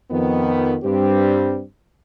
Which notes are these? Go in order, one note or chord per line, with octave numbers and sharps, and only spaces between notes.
F2 D#3 B3
G2 G3 C4 G4